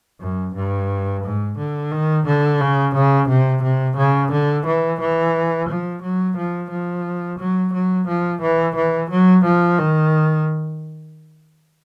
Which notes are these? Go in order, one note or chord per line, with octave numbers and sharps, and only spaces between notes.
F#2
G2
G#2
D3
D#3
D3
C#3
C#3
C3
C3
C#3
D3
E3
E3
F3
F#3
F3
F3
F#3
F#3
F3
E3
E3
F#3
F3
D#3